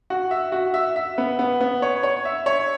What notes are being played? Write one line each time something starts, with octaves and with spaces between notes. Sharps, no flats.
F#4
E5
F#4
E5
E5
B3
B3
B3
C#5
C#5
E5
C#5